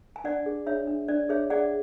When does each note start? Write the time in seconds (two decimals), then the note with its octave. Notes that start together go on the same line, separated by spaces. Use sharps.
0.16 G#5
0.24 D4 D5 F#5
0.46 G#4
0.67 D4 C#5 E5
0.87 D4
1.08 D4 D5
1.29 G#4 C#5 E5
1.50 G#4 D5 F#5